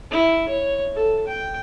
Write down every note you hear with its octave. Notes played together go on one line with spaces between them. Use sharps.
E4
C#5
A4
G5